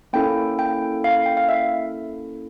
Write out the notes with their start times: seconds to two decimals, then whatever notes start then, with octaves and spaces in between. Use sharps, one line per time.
0.13 A#3 C#4 E4 A4 G5
0.59 G5
1.04 F5
1.26 G5
1.37 F5
1.49 E5